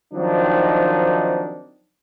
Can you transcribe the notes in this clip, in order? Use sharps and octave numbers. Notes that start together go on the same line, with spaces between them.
D#3 F3 F#3 C4 D4 D#4